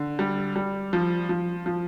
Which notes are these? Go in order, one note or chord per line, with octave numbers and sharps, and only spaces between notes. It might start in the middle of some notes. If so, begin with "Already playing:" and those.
Already playing: D3
G3
G3
F3
F3
F3